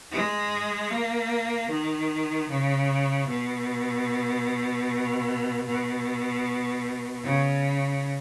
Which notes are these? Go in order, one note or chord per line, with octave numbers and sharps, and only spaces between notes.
G#3
A#3
D#3
C#3
B2
B2
C#3